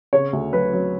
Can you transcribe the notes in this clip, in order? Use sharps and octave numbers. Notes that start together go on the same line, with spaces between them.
C#3 C#5
D2
F#3 B4
F#3